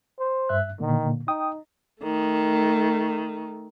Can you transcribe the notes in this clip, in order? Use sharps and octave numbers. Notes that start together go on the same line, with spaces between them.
C5
G2 E5 F#6
A#2 D3 D#3 A#3
D#4 G5 D#6
D#3 A3